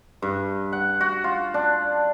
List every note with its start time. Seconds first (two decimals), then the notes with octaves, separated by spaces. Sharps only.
0.22 G2
0.73 F#5
1.01 F#4
1.24 F4
1.54 D4